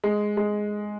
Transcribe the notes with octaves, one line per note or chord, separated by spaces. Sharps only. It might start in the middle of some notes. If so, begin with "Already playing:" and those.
G#3
G#3